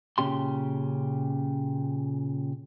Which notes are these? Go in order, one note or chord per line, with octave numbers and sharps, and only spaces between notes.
A#2 C#3 C#4 G4 C6